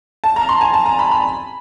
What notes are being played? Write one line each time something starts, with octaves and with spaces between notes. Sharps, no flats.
A5
A#5
C6
G#5
A5
A#5
B5
B5